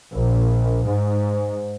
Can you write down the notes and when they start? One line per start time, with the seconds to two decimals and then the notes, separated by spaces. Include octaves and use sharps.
0.13 A#1
0.84 G#2